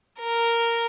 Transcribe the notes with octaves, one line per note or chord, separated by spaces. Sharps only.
A#4